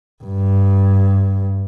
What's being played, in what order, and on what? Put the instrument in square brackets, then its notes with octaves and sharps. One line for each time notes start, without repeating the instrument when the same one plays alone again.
[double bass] G2